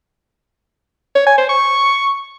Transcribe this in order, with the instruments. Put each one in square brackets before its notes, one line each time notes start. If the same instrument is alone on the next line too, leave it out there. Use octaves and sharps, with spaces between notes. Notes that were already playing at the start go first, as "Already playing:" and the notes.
[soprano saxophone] C#5
G#5
C5
C#6